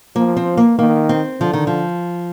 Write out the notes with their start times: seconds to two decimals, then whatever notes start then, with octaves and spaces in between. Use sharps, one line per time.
0.16 F3 A#3
0.37 C4
0.57 A#3
0.78 D#3 A#3
1.09 C4
1.40 D3 F3
1.53 D#3
1.67 F3